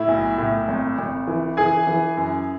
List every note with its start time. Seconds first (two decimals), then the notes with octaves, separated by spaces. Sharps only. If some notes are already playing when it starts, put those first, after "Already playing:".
Already playing: A2 E4
0.08 B1
0.38 A2
0.68 G#1
0.98 G#1
1.27 E3
1.57 E3 G#4 G#5
1.87 E3
2.17 F#2